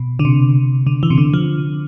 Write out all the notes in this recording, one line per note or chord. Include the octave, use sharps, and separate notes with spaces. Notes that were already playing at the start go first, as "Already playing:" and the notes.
Already playing: B2
D3
C3
D3
E3
C3
D3
F3